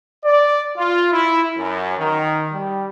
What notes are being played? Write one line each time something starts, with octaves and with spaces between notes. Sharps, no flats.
D5
F4
E4
F#2
D#3
G3